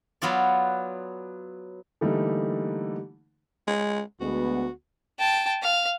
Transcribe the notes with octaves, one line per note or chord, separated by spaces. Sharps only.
F#3 B3 F4 D5
D3 E3 G3 A3 A#3 D#4
G#3
D2 G#3 B3 F#4
G5 A5
F5